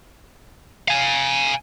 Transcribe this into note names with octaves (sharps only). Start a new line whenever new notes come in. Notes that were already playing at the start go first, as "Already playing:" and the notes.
F5 G#5